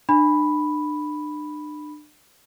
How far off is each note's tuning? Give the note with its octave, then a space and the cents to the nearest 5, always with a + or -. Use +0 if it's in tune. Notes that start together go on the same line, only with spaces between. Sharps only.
D4 +35 B5 +0